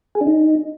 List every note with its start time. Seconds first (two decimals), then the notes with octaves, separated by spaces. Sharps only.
0.15 G#4
0.21 D4
0.27 D#4